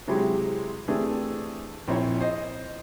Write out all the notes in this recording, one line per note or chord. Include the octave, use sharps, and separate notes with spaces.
C3 F#3 G#3 C4 E4 G4
E3 A3 C4 D4 G4 G#4
A#1 C4 E4 C#5
C5 D#5